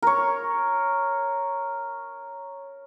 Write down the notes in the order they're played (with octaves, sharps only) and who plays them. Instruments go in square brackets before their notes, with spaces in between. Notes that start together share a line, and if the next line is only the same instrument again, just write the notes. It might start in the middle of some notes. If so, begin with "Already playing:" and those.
[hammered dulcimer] A#4 C#5